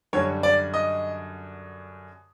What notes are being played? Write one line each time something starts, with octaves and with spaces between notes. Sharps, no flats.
F#2 D3 G3 C#5
D5
D#5